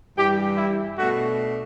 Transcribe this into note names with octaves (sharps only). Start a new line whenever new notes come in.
G2 E3 G3 G4
E4
B2 A3 D4 F#4